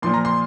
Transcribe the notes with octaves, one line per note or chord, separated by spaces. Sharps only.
A#2 F3 A#3 C6
A#5
C6